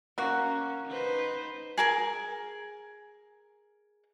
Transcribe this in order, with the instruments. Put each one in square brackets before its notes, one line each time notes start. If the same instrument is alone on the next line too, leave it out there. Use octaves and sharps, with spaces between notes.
[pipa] A#3 F#4 [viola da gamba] C#4
[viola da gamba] D#4 B4 C5
[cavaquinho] G#4 A#4 G#5